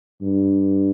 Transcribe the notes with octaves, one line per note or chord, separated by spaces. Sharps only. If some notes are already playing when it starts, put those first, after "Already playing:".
G2